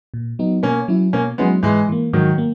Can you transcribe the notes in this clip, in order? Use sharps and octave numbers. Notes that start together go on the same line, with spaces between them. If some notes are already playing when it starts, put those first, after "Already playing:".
A#2
F#3 B3 D#4
B2 A#3 C#4
F#3 C#4 E4
B2 A#3 C#4
F#3 G#3 B3 C#4 E4
G#2 E3 G#3
E3 A#3
G#2 D#3 F#3
A#3